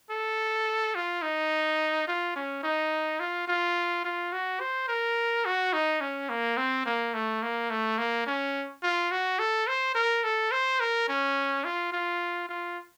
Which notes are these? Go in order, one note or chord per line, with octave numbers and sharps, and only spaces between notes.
A4
F4
D#4
F4
C#4
D#4
F4
F4
F4
F#4
C5
A#4
F#4
D#4
C#4
A#3
C4
A#3
A3
A#3
A3
A#3
C#4
F4
F#4
A4
C5
A#4
A4
C5
A#4
C#4
F4
F4
F4